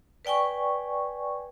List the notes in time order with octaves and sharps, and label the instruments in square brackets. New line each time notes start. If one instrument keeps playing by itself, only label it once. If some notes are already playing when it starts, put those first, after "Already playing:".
[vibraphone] B4 D5 G5 G#5 C#6